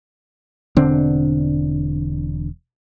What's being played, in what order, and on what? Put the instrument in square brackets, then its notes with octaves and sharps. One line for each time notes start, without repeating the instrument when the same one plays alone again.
[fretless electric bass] E1 D3 C4 D4